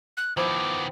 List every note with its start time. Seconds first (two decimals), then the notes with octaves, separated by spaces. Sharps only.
0.17 F#6
0.37 D#3 F3 B3 E4 C5 D6